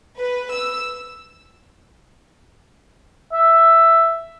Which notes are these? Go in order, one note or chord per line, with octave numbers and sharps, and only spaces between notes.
B4
E6
E5